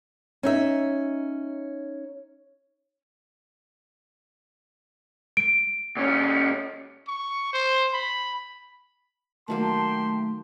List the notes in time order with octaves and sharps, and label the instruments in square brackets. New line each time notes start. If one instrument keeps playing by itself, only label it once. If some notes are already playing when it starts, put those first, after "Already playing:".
[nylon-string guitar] C#4 D#4 E5
[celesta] D7
[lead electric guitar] A#2 C#4
[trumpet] C#6
C5
B5
[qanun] D#3 F#3 A#3 [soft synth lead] A3 [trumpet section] G4 G5 C6 [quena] A5